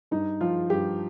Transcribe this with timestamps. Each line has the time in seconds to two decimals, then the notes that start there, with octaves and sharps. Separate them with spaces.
0.11 G2 D#4
0.41 F3 F4
0.70 G2 G4